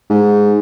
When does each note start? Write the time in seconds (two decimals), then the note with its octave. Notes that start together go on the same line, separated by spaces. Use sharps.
0.10 G#2